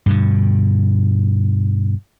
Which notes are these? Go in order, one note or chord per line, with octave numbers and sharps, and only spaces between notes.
G2 B2 D3